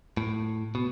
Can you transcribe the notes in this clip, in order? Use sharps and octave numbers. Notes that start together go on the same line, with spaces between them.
A2
B2